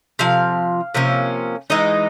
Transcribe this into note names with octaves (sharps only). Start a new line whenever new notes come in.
C3 F3 F5
C3 F3 A#3 C#4
E3 G#3 D#4 D#5